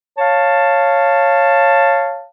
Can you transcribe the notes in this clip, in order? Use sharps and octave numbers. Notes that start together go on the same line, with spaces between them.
C#5 F5 A5